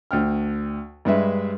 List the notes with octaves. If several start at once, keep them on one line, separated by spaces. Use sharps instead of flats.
D2 G5 F6
G2 G#3 B4 E5